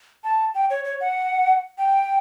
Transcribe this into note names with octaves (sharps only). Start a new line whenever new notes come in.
A5
G5
C#5
C#5
F#5
G5